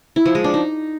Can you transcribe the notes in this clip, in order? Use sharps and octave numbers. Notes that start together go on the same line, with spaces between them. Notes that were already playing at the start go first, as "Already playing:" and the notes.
E4
F3
G#3
D4
D#4